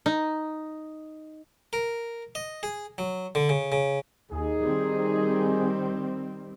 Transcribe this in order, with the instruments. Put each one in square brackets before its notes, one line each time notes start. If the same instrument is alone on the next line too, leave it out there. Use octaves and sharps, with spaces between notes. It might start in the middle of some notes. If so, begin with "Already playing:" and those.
[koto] D#4
[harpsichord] A#4
D#5
G#4
F#3
D3
C#3
C#3
[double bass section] D#2 [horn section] D#4 G#4
[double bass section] D#3 G3 C4